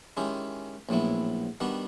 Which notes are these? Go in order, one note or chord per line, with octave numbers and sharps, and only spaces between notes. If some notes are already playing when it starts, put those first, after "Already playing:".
D#3 G#3 C#4 E4 G4
A#1 A2 F#3 B3 E4
D#3 G3 B3 D4 F#4